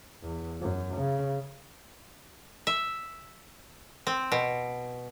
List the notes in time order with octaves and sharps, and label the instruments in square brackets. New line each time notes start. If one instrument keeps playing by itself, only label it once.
[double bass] E2
F#2
C#3
[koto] E5
C4
B2